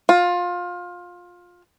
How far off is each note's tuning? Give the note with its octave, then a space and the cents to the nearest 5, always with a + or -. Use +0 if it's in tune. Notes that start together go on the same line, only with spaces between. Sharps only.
F4 +20